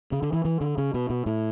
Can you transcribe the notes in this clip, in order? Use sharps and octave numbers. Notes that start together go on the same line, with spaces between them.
C#3
D3
E3
E3
D3
C#3
B2
B2
A2